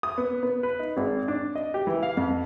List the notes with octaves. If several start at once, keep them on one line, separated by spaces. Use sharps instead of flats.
D#6
B3
B3
B4
D#4
G#1
D4
D#5
G4
E3
F5
F2